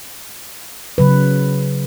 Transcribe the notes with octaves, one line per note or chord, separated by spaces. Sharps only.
C#3 F#3 B4